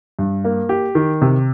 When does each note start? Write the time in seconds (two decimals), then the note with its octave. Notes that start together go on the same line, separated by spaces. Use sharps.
0.19 G2
0.45 A#3
0.69 G4
0.95 D#3
1.22 C3